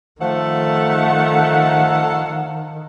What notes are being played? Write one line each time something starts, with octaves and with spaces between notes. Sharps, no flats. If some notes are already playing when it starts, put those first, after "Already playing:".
D#3 F3 A3 A4 F5 F#5